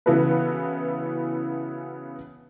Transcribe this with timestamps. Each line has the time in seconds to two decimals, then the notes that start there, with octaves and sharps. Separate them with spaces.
0.06 C#3 E3 B3 F#4 A4 B4